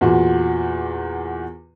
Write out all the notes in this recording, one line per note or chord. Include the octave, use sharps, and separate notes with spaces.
E2 A#2 F#4